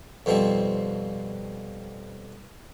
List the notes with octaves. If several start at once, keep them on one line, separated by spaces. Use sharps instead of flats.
F2 B2 F3 G3 C4